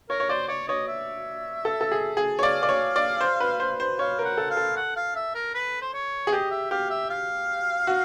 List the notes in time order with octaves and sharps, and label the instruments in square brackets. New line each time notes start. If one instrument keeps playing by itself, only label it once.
[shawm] A#4 [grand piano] C#5
[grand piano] C#5
[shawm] C5 [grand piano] D5
[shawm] C#5 [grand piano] D5
[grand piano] C#5 [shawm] D#5
[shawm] E5
[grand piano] A4
A4
G#4
G#4
C#5
[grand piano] D5 [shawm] F5
[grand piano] D5
C#5
D5
C5
B4
C5
C5
[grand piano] C#5 [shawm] F5
[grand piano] A#4
[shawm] F#5
[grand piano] A4
[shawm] F5
[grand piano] A4
[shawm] F#5
F5
E5
A#4
B4
C5
C#5
[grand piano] G#4
[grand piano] G4 [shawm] D#5
[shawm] E5
[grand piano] G4 [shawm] F5
[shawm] E5
F5
[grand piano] F#4